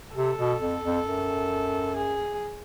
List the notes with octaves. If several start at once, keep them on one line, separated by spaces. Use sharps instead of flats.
C3 A4
B2
F2
F2
F#2
G#4